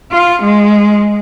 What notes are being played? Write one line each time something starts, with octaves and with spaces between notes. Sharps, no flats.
F4
G#3